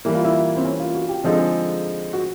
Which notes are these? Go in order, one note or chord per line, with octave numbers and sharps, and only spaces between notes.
E3 G3 A#3 E4
F4
E4
C4
C#4
F4
F#4
G4
D3 F3 G#3 C4 D#4 A4
G#4
F#4